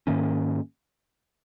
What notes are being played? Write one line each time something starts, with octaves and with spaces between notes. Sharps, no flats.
G#2 D#3 A#3 C#4